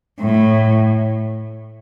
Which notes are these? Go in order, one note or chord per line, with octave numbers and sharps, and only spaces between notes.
A2